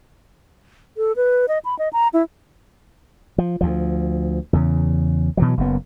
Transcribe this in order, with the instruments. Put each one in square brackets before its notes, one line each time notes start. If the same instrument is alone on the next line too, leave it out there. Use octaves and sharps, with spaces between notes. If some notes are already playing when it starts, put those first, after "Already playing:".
[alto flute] A4
B4
D#5
B5
D#5
A#5
E4
[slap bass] F3
D2 F3
E2 C#3
B2 E3 F#3
F#1 F#2 B3